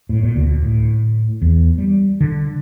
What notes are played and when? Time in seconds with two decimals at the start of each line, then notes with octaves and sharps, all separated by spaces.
0.09 A2
0.23 A#2
0.36 D2
0.63 A2
1.42 E2
1.78 G3
2.21 D3